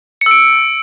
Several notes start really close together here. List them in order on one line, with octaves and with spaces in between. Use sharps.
C#7 E6 D7